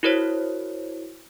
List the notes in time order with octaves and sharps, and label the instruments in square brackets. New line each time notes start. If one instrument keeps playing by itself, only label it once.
[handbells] E4 F#4 A#4 C5 C#5